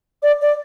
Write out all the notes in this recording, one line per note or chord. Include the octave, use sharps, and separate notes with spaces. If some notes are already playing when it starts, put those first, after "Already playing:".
D5
D5